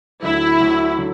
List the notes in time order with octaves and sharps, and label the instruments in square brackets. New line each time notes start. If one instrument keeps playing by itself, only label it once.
[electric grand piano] D2 D3 F#3 [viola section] E4
[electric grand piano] D2 D3 F#3
D3 F#3